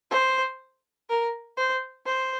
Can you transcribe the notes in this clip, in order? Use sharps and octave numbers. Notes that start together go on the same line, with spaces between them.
C5
A#4
C5
C5